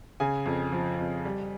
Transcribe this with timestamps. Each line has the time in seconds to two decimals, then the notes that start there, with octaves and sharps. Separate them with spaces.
0.20 C#3 G#5
0.46 F2
0.72 F3
0.99 F2
1.25 G3